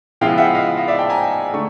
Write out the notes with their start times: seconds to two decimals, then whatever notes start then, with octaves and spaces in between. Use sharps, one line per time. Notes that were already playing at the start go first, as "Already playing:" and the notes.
0.21 C#3 F3 G#3 B3 E4 F5 G5
0.38 E5 F#5
0.55 D#5 F5
0.77 D#5
0.88 D5 E5
0.98 G5 A5
1.10 G#5 A#5
1.54 D3 A3 C#6